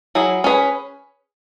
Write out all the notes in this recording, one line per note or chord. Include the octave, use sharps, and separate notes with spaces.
F#3 E4 G#4
C#4 G#4 B4